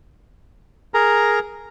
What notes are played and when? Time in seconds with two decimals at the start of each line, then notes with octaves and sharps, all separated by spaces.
0.94 G#4 A#4 A#5